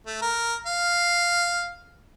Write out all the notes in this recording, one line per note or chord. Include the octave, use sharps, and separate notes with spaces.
A3
A#4
F5